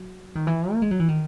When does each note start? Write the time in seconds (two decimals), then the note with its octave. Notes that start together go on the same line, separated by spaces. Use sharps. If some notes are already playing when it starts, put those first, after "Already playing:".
Already playing: F#3
0.35 D#3
0.47 E3
0.73 A#3
0.82 G#3
0.91 F#3
0.99 E3
1.08 D#3